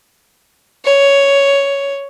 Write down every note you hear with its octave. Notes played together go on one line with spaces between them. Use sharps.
C#5